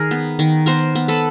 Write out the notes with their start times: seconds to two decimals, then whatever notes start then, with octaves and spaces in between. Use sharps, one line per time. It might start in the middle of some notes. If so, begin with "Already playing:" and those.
Already playing: D#3 G#4 A#4
0.11 B3
0.39 D#3
0.66 B3 A#4 C5
0.95 B3
1.08 A4 B4